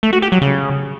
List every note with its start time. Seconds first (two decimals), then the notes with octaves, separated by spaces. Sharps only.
0.03 A3
0.13 F#4
0.22 G4
0.32 F#3
0.42 C#3